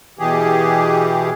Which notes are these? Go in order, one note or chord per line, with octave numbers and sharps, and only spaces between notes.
B2 E3 G4 G#4